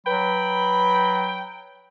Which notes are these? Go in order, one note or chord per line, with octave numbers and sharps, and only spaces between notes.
F#3 B4 G5 B5